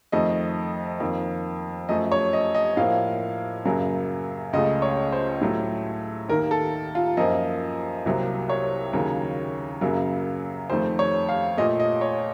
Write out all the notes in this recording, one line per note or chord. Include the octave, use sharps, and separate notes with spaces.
F2 D#3 A3 D#5
F2 D#3 A#3
F#2 F3 A3 D#5
C#5
D#5
D#5
A2 F3 A#3 F5
F#2 C#3 F#3 A#3
C#2 C#3 A3 D#5
C#5
C5
A2 F#3 A3
D#2 D#3 A#3 A#4
A4
F4
F#2 F3 A#3 D#5
C2 C3 F#3 A#3
C#5
D#2 C#3 F#3 A#3
F#2 C#3 F#3 A#3
F2 D#3 A3 C5
C#5
F5
A#2 A3 D#5
D#5
C#5